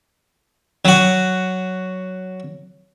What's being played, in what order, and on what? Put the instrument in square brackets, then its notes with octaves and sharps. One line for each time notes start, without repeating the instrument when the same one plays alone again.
[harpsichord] F#3 F#4